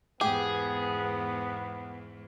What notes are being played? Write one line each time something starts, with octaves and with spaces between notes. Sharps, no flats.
E2 G#2 B3 G4 G#4